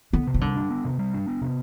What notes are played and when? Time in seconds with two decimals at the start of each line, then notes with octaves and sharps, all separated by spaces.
0.13 D3 B3
0.27 C3
0.34 E3
0.41 D3 G3
0.56 D4
0.71 B3
0.85 C3
0.99 G3
1.14 D4
1.28 B3
1.42 C3